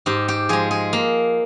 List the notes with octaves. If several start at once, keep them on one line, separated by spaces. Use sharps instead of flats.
G#2 G4
G4
F3 G#3 G#4
G#4
A#3